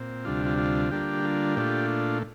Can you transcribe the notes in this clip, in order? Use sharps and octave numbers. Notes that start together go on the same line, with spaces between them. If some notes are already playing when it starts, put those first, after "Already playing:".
Already playing: A#2 C4
D2 C3 G3 D4 F4
F4
F4
D3 G3 A#3 D4 F4 G4
F4
A#2 A3 D4 F4 G4